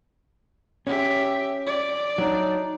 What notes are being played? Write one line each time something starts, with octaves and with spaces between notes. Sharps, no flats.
C#4 G4 E5
D5
F#3 D4 D#4